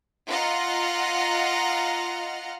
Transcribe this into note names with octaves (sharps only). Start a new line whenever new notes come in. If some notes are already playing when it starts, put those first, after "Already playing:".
F4 D#5 F#5 A#5 F6